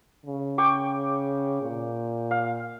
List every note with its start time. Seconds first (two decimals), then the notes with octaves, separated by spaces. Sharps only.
0.26 C#3
0.58 G5 C#6 D6
1.62 A#2
2.31 F5